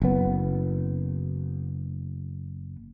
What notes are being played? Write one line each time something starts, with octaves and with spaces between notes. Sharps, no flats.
F#1 B3